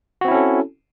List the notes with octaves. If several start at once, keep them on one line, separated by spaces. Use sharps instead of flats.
C4 C#4 E4 F#4 A4